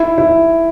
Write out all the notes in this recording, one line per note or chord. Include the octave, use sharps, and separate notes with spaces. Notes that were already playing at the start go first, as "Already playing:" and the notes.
Already playing: E4
E4